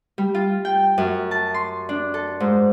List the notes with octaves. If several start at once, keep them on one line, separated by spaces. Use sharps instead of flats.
G3
F4
G5
F#2
A5
C6
D4
A4
G#2